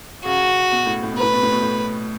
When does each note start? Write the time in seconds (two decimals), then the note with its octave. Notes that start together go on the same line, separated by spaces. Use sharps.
0.25 C#3 F#4
0.72 B2
0.86 A2
1.03 A2
1.12 B2
1.17 A2 B4
1.33 B2
1.43 A2
1.52 B2
1.63 A2